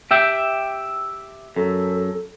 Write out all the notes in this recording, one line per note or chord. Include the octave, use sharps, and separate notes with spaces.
G4 E5 G5
F#2 A4